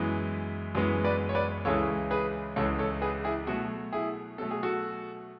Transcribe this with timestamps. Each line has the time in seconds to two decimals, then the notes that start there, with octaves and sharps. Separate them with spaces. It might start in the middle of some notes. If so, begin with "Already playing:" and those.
Already playing: F#2 E3 G#3 B3
0.75 F#2 E3 G#3 B3
1.04 B4 D5
1.29 C#5
1.35 B4 D5
1.65 C#2 C#3 E3 G#3 A4 C#5
2.11 G#4 B4
2.56 C#2 C#3 E3 G#3 A4 C#5
2.79 A4 C#5
3.02 G#4 B4
3.24 E4 G#4
3.47 B2 F#3 A3 F#4
3.93 E4 G#4
4.38 B2 F#3 A3 A4
4.51 G#4
4.63 F#4 A4